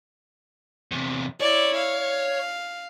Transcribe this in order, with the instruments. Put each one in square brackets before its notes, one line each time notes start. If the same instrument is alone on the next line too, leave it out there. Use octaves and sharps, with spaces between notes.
[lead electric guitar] E2 C3
[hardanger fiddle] E4 D5 [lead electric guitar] C#5
[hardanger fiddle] F5